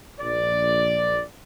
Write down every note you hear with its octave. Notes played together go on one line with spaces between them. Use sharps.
A#1 D5